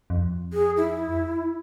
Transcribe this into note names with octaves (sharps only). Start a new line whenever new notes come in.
F2
G#4
E4